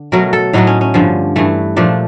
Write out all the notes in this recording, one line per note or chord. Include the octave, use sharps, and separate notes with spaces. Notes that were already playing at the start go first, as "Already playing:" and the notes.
Already playing: D3
B2 F#3 A3 A#4
A4
A2 F#3 A3 D#4
C#4
C#4
G2 D3 F3
G2 E3 A3
A#2 F3 A3 D4